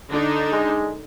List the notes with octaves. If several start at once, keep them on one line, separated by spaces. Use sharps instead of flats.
D3 D4 D#4
G#3